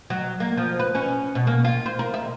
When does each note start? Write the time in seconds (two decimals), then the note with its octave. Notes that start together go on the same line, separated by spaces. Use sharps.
0.10 F#3
0.40 A#3
0.57 F3
0.79 B4
0.95 C#4
1.35 B2
1.47 A#3
1.65 F4
1.86 C5
1.99 A#4
2.14 E5